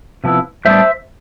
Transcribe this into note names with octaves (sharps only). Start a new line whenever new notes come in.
C3 F3 B3 E4
A2 G3 B3 D4 C5 E5